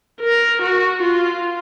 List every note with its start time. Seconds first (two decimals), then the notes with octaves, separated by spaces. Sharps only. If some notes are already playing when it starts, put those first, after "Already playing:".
0.21 A#4
0.62 F#4
1.02 F4